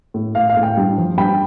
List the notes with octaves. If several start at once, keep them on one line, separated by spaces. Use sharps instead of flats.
A2
A2 F5
F5
A2
G5
G2
F3
G2 G5 B5